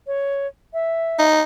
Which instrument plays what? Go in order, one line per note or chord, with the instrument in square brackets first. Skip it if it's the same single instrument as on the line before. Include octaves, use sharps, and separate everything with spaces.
[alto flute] C#5
E5
[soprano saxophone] D#4